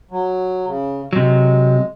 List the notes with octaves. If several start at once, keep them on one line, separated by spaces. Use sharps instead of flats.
F#3
C#3
C3 F#3 G#3